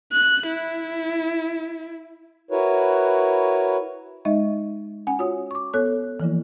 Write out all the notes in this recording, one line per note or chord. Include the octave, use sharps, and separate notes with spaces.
F#6
E4
E4 F#4 A#4 B4 C#5
G#3 D#4 D#5 E5
C#4 F#5 G#5
F4 F#4 C#5 D#6
C#6 D6
B3 A4 C#5 F#6
E3 F3 A#3 E4